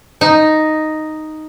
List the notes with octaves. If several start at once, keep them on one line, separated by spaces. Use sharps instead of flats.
D#4